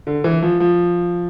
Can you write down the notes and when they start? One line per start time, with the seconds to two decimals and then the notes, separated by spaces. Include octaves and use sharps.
0.07 D3
0.24 E3
0.42 F3
0.60 F3